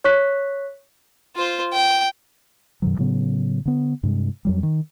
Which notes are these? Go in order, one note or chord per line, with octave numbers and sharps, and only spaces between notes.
C#5 C#6 F#6 B6
F4 C5
G5
F#2 B2 D#3 F#3
A2 C#3 F#3 B3
D3 B3
G2 C3 G#3
F2 F#3 G3
D#3